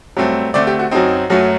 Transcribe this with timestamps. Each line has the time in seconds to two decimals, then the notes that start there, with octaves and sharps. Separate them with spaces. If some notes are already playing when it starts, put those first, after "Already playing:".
0.17 G2 F#3 A3 C4
0.54 D3 A3 C4 D5
0.67 G4
0.79 F#4
0.91 F#2 F#3 C4 D#4
1.30 F#2 F#3 A3